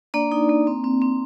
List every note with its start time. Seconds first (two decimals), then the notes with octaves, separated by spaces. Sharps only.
0.14 A#3 D4 D5
0.32 D#4
0.49 A#3
0.67 C4
0.84 C4
1.02 C4